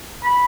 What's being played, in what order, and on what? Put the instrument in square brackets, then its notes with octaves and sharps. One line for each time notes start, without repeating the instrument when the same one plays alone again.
[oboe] B5